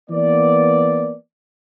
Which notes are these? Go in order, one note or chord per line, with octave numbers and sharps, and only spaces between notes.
E3 A#3 B3 D5